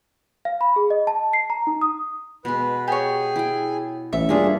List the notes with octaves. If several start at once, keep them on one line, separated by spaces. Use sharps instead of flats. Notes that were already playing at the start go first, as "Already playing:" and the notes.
F5
B5
G#4
D#5
A5
C7
A#5
D#4
D#6
B2 G#3 B4
G4 G#4 C#5 G#5
E4 G5
A1 A4 E5
G2 A#3 D4 F4 G#4 A4